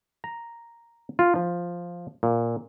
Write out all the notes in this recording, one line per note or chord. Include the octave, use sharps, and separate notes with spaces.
A#5
F4
F3
A#2